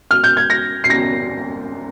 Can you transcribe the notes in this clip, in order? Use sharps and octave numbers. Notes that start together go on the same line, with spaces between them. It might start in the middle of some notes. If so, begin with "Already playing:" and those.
F6
G6
G#6
A#6
C7
A#6